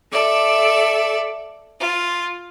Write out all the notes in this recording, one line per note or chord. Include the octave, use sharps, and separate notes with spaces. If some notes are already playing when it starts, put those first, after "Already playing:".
A4 D5 E5
F4